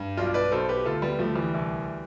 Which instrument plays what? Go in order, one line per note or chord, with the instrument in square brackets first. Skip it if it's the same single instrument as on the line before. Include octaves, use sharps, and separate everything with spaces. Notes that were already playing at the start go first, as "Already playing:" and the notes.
Already playing: [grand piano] G2
B1 D4 F4
B4 D5
B1 A4 C5
G4 B4
D2 F4 A4
G3 B3
D2 F3 A3
E3 G3
C2